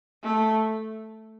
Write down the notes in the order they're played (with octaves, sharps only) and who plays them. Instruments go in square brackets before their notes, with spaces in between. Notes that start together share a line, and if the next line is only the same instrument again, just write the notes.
[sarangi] A3